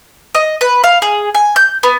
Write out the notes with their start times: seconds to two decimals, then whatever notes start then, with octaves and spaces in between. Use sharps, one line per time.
0.35 D#5
0.61 B4
0.84 F5
1.02 G#4
1.35 G#5
1.56 G6
1.83 B3